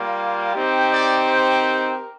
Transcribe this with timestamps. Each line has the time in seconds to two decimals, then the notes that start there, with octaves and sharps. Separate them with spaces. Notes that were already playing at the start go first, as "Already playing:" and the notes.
Already playing: G3 A#3 F4
0.54 C4 D#4 G4
0.90 D5
1.26 C5
1.63 A#4